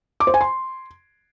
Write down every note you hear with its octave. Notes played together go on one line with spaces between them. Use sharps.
D6
C5
G#5
C6